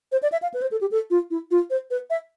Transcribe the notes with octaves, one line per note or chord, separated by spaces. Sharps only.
C5
D5
E5
F5
B4
C5
A4
G4
A4
F4
E4
F4
C5
B4
E5